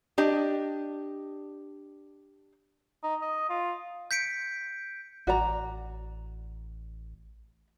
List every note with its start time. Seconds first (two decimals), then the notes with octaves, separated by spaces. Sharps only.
0.18 D4 G4 D#5
3.03 D#4
3.21 D#5
3.49 F4
4.11 G6 B6 C#7 D7
5.27 A1 F#4 D5 A#5